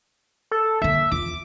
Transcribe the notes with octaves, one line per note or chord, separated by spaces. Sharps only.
A4
D3 A#3 E5
E2 F4 D6